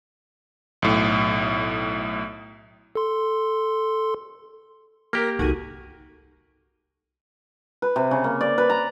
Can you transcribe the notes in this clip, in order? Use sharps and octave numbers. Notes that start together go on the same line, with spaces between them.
B1 A2
A4 C6
A#3 G4 A#4
C2 F2 D#4 F#4 A4 D#7
B4
C3
C#3
A#3
D5
B4
A#5